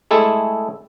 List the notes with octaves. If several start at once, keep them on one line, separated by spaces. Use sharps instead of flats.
G#3 A3 E4 G#4 A4